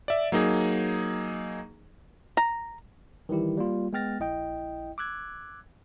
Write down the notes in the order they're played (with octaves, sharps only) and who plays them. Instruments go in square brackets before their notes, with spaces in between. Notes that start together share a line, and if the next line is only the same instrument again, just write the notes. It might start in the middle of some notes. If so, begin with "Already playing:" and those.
[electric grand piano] D5 E5
F#3 A#3 D#4 G#4
[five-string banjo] A#5
[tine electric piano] D#3 E3 G3 E4 G4
G3 A#3 F4
G#3 B3 G5 F6 A6 A#6
A#1 E4 D#5 G5
D6 E6 F#6 G#6